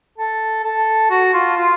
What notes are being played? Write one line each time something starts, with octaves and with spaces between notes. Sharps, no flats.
A4
A4
F#4
F4
F4